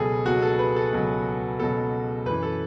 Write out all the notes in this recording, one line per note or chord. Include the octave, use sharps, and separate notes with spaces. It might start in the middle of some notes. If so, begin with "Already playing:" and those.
Already playing: C#2 B2 F#3 G#4 A4 B4
C#2 B2 F#3 F#4
A4
B4
A4
C#2 B2 F#3
C#2 B2 F#3 A4
F#2 E3 B4
A4